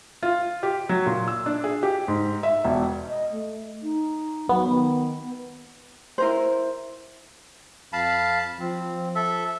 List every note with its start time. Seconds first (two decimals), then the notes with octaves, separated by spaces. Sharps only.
0.23 F4
0.63 G4
0.89 F#3
1.06 A#2
1.28 E6
1.46 D4
1.64 G#4
1.83 G4
2.08 G#2
2.43 E5
2.64 E1
3.08 D#5
3.31 A3
3.83 D#4
4.49 F#3 B3
4.69 D#3
6.18 E4 A#4 C5
7.93 F2 F5 A5 B5
8.60 F3 C4
9.15 A4 E5